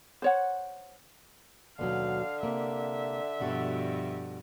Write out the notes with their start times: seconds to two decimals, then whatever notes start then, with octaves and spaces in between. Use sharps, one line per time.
0.22 C5 C#5 F#5
1.79 D#2 B2 D3 F#3 F5
2.43 C3 A#3 E5
3.40 G2 B2 F3 D4 F#4 A4